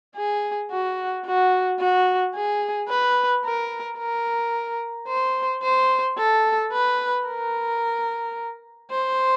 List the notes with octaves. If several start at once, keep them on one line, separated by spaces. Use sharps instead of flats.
G#4
F#4
F#4
F#4
G#4
B4
A#4
A#4
C5
C5
A4
B4
A#4
C5